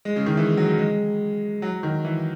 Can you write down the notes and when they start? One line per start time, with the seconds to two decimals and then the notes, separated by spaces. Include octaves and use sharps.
0.05 G#3
0.16 C#3
0.26 D#3
0.37 E3
0.57 F#3
0.78 G#3
1.62 F#3
1.83 D#3
2.05 E3